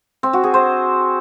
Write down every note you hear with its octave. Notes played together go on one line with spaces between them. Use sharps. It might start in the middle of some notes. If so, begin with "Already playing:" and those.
C4
F#4
G#4
C5